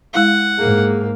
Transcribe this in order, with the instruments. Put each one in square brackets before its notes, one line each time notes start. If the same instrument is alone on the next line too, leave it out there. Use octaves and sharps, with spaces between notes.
[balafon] G#3 E4 F5 [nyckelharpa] F#5
[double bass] G#2 A#3 [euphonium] G#4